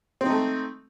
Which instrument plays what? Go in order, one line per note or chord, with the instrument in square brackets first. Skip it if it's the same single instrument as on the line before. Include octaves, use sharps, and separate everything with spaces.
[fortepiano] C4
D#4
A3